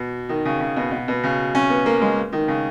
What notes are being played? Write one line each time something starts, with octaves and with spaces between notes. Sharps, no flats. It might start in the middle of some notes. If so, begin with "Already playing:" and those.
Already playing: B2
D#3
C#3
C#3
B2
B2
B2
C#3
C#4
B3
A#3
G#3
D#3
C#3